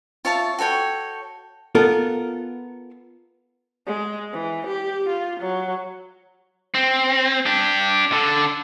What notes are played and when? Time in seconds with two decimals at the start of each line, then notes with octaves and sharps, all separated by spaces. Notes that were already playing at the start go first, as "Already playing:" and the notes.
0.25 F4 C#5 E5 A5
0.59 F#4 A4 C#5 G5
1.75 B3 F4 A4 A#4
3.87 G#3
4.33 E3
4.67 G4
5.09 F4
5.40 F#3
6.74 C4
7.46 D4 G4
8.12 D3 A4